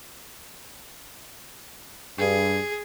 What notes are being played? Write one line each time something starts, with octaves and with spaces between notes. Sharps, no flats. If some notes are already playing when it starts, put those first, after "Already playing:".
G2 G#4